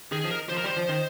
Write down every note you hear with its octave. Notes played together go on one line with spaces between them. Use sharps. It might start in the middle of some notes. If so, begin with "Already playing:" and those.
D#3 G#4
G#4
F3
A#4
F3 C5
A#4
G3
C5
F3
D#3